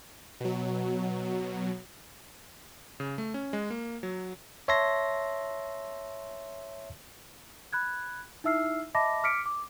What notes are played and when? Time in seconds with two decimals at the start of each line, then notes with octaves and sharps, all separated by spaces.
0.40 B2 F#3
3.00 C#3
3.18 A3
3.34 C#4
3.53 G#3
3.70 A#3
4.03 F#3
4.68 C#5 E5 A5 C6 A#6
7.73 B5 F#6 G#6
8.44 D#4 E4 E5 E6 F6 C7
8.94 D#5 E5 A5 B5 D6 A#6
9.23 D6 F6 B6 C#7 D7
9.46 D6